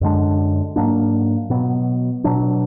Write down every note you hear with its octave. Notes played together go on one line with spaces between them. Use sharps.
F#2 D3 G#3 D4
G#2 F#3 A#3 D4
B2 F#3 B3
B2 F#3 D4